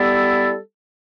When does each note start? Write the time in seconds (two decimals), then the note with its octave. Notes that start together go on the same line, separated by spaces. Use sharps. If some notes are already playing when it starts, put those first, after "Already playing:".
Already playing: G3 B3 E4 A4